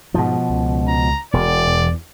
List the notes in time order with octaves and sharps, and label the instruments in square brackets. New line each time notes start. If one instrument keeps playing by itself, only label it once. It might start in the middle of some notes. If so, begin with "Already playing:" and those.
[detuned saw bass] G#2 [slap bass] B2 F3
[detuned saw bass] C#2
[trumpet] A#5
[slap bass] E1 [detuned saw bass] B2 [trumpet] D5
[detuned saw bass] E2